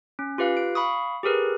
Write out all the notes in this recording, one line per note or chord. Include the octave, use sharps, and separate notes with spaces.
C#4
F4 G4 B4 F5
D7
F5 B5 C#6 D#6
G4 G#4 A#4 B4